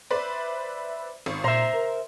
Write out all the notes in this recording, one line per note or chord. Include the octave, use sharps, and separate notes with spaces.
B4 C5 D5 E5
G#1 C#6
A#2 C5 E5 A#5 C6
A#4